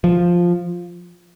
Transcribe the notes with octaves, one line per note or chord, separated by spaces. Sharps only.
F3